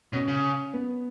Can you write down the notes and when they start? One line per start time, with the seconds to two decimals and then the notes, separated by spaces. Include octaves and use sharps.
0.13 B2 C#4
0.28 C#3
0.73 B3